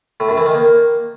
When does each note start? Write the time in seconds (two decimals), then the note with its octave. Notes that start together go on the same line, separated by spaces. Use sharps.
0.20 A2
0.29 F#2
0.37 E3
0.46 D#3
0.55 A#3